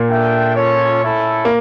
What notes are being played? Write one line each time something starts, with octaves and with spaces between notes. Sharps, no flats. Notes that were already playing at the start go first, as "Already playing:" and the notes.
Already playing: A#2 A#3
D4 A4 E5 G5
C#4 F4 A4 C#5
A3 C#4 E4 A4
A#3